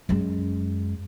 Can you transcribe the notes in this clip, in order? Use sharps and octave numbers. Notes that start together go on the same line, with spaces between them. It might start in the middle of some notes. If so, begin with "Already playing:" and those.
F#2 G#3